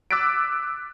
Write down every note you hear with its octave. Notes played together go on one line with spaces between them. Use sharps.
D6 E6 F#6 A6 B6 D7